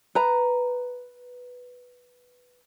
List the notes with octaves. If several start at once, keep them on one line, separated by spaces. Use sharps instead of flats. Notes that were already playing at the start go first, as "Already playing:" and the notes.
B4 A#5